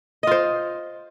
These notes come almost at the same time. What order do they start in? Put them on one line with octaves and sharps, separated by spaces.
D#5 F4 C5